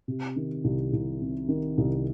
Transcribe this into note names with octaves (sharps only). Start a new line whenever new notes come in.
C3
D#3
C2
C2
C3
D#3
C2